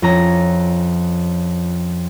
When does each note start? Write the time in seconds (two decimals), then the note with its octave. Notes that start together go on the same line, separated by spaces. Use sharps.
0.02 F2 C#4 A#5